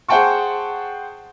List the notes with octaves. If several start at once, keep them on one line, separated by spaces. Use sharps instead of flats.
G#4 C5 F#5 G5 A5 C#6